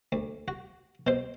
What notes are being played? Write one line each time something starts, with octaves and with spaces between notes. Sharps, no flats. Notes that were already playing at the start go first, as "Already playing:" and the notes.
D2
F#4
B2 C5